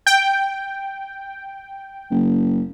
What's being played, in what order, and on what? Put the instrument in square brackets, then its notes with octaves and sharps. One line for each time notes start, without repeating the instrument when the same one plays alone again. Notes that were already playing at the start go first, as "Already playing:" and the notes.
[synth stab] G5
[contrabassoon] F#1